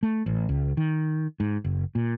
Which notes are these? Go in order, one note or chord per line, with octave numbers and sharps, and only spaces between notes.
A3
A1
C#2
D#3
G#2
F#1
A#2